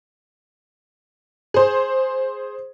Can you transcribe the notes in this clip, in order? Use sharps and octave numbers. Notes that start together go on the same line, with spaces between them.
G#4 C5